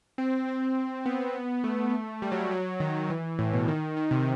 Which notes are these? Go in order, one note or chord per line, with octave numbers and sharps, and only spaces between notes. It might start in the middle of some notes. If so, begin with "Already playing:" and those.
C4
C4
B3
A3
G3
F#3
G3
F#3
D#3
E3
A2
B2
D#3
D#3
C3